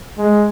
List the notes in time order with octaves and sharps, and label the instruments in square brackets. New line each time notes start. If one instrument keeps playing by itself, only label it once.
[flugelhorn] G#3